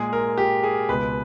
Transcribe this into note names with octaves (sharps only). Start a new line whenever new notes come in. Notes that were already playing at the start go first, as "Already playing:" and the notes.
Already playing: A#2 G#3 G#4
A#4
G4
G#4
C#2 B2 G#3 B4